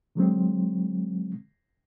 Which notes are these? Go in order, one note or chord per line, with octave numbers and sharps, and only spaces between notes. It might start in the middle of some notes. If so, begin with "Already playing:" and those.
D3 F#3 G#3 C4